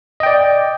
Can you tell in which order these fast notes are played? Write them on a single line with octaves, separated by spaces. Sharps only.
D#5 G5 D5